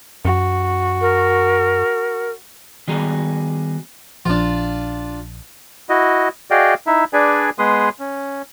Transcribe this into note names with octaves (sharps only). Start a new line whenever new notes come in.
F#2 F#4
A#4
D#3 G3 B3 F#4 G#4 A#5
A#1 F3 D4 F4
E4 F#4 D#5
F#4 G#4 D5 D#5 F5 G5
D#4 E4 E5
D4 G#4 B4 D5 G#5
G#3 B3 G#4 B4 C6 D#6
C#4